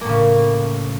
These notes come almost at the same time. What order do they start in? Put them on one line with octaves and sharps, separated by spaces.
A#3 A2 C#3